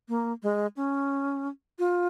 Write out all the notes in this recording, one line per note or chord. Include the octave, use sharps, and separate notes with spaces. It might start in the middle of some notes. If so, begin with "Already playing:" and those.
A#3
G#3
C#4
F4